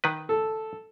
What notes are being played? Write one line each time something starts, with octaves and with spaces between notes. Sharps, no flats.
D#3 B4
A4